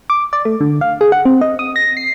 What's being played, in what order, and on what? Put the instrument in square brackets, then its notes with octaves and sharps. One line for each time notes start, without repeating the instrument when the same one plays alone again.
[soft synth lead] D6
D5
A3
D3
F5
G#4
F#5
C4
D#5
D#6
A#6
C7